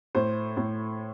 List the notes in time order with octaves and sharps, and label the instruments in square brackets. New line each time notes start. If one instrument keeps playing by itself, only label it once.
[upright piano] A2 C5
A2